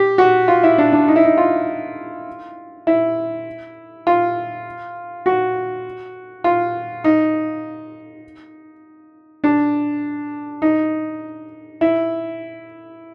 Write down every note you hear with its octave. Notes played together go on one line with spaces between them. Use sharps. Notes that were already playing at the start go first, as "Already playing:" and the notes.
Already playing: G4
F#4
F4
E4
D4
D4
D#4
E4
D#4
F4
E4
F4
F#4
F4
D#4
D4
D#4
E4